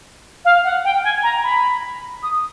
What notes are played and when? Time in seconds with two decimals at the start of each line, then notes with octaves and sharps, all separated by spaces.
0.45 F5
0.64 F#5
0.84 G5
1.04 G#5
1.23 A#5
1.43 B5
2.22 D#6